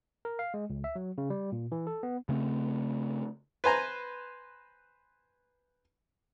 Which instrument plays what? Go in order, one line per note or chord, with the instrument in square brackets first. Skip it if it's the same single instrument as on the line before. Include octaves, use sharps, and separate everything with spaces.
[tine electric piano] A#4
F5
G#3
C#2
E5
F#3
C#3
G3
A#2
E3
A4
B3
[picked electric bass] C#3 A3 C4
[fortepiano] B4 C5 G#5 A#5